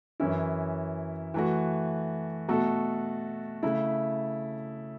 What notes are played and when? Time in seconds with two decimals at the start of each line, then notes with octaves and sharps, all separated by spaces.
0.20 F#2 E3 C#4 E4
1.34 E3 A3 F#4
2.48 B2 A3 F#4 A4
3.63 C#3 A3 E4